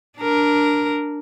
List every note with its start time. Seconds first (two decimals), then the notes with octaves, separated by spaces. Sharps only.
0.19 D4 A#4